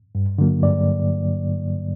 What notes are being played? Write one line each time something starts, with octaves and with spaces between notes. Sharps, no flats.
G2
D3 F#3 A#3
G2 D5